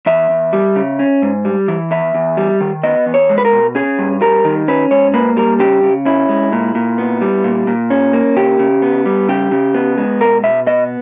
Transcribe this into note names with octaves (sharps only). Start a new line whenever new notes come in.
E2 E5
E2
G3
C#3
C#4
G#2
G3
E3
E2 E5
E2
G3
D#3
B3 D#5
E2
C#5
G#3
B4
A#4
B2
C#4 G#4
G2
G3 A#4
D#3
C#4 B4
G#2 C#5
A#3 B4
G3 A#4
C#3 G4
C#3
C#4 E4
G#3
A#2
A#2
B3
G3
A#2
A#2
C#4
A#3
C#3 G4
C#3
B3
G3
C#3 G4
C#3
B3
G#3
B2 A#4
B2 E5
B3 D#5